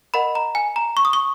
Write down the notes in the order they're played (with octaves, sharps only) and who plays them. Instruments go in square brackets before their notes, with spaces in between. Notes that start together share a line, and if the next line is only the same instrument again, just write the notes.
[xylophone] A#4 D#5 F#5 B5
A#5
G#5
A#5
C#6
D#6
C#6